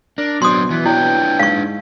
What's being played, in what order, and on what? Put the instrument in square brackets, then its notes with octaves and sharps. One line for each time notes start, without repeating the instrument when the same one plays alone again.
[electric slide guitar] D4 [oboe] A#4
[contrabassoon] B2 [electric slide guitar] F#3 D4 [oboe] C5 [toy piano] C6 D#6
[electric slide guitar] E3 [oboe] B3
[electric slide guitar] D4 B4 C#5 [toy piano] E4 [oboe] G5
[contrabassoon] G#2 [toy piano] F5 C#6